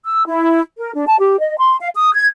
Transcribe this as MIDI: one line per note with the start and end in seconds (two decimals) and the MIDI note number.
0.05 0.26 88
0.26 0.60 64
0.78 0.91 70
0.95 1.05 62
1.07 1.19 81
1.19 1.38 67
1.40 1.56 75
1.58 1.77 84
1.80 1.89 77
1.94 2.13 87
2.14 2.27 92